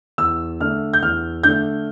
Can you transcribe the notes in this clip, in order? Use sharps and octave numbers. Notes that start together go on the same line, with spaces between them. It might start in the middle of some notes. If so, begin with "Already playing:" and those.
E2 E6
D3 A3 D4 F6
G6
E2 F6
D3 A3 D4 G6